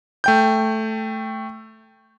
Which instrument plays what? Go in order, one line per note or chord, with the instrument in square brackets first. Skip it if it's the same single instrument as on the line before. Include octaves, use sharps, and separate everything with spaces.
[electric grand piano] A3 G5 G6